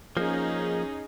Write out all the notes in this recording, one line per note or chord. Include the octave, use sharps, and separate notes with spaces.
F3 A#3 C#4 D#4 G#4